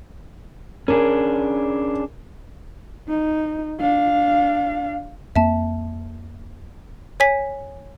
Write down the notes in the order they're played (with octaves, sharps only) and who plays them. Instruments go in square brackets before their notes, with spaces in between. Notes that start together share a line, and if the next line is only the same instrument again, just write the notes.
[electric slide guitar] C#4 D4 G#4 [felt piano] A#4
[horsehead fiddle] D#4
D4 F5
[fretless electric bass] F2 A#3 [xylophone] E5 A5
[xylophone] C#5 G#5 B6